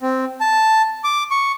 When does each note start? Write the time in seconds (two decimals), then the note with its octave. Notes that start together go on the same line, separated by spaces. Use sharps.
0.01 C4
0.41 A5
1.04 D6
1.31 C#6